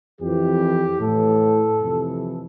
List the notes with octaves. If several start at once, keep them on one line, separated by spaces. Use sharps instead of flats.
F2 E3 G4
A2 E3 A4
F2 C3 E3